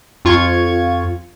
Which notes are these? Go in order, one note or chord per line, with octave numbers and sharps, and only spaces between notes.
F2 F4 C#6 G#6